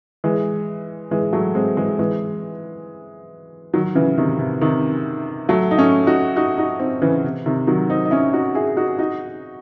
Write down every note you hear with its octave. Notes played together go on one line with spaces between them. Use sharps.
E3 G#3
E3 G#3
F#3 A3
G#3 C4
E3 G#3
E3 G#3
D#3 F#3
C#3 E3
C3 D#3
C3
C3 D#3
F#3 A3
D#4
A3 C#4
D#4 F#4
D#4 F#4
D#4 F#4
C4 D#4
C#3 E3
C3
C3 D#3
D#3 F#3
C4 D#4
D#4
C#4 E4
D#4 F#4
E4 G#4
D#4 F#4
D#4 F#4